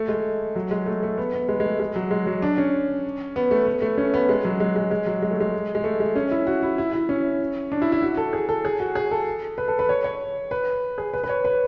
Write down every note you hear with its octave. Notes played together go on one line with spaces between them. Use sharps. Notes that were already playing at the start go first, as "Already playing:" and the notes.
Already playing: A3
G#3
F#3
G#3
A3
A3
B3
B3
G#3
G#3
A3
G#3
F#3
G#3
F#3
D4
C#4
B3
A3
B3
A3
C#4
B3
G#3
F#3
G#3
G#3
G#3
F#3
G#3
A3
G#3
G#3
A3
G#3
C#4
E4
F#4
E4
E4
E4
C#4
D4
E4
E4
F#4
A4
G#4
A4
G#4
F#4
G#4
A4
B4
A4
B4
C#5
C#5
B4
G#4
B4
B4
C#5
B4